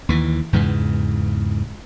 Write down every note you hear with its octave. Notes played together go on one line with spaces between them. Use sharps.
D#2 E3
E2 G#2 C#3 E3